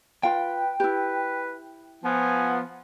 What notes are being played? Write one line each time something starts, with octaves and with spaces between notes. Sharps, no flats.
F4 B4 F5 G5
E4 G4 B4
F3 B3 G#5